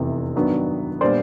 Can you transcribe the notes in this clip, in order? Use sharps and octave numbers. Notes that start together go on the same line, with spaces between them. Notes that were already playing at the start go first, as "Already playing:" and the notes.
Already playing: F1 E2 C3 E3
G2 D#3 F#3 B3 D4
A#2 G3 B3 D4 C5 D5